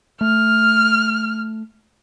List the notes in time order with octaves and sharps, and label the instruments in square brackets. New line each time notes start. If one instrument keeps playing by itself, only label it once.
[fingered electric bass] A3 [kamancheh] F6